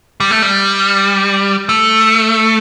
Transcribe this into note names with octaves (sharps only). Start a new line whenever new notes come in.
G3
A3
G3
A3